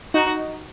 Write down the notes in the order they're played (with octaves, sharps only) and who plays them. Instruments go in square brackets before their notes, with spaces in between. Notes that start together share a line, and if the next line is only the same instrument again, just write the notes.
[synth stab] D#4 [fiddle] F#4